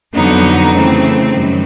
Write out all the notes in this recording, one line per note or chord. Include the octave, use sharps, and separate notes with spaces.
F2 D3 F#3 B3 D#4
C#3 E3 A3 C4
F#2 D#3 G3